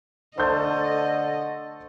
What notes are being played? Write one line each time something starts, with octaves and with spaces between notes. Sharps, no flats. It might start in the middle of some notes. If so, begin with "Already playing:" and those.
D3 A3 A4 C5 D#5 A5 C6 G6